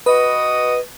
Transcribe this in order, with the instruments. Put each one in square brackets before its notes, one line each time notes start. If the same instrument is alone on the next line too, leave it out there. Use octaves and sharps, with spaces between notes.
[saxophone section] F#4 D#5 [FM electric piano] B4